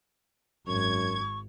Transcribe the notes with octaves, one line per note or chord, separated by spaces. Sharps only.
G#1 F#2 C#6 G#6